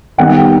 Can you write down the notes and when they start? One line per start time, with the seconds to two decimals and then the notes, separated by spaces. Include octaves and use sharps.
0.18 D#3 G3 B3 D#4 F#5
0.35 G5